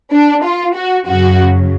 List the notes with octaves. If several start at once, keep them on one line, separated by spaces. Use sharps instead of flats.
D4
F4
F#4
F#2 C#3 F#3 F#4